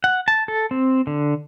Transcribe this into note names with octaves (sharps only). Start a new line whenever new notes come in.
F#5
A5
A4
C4
D3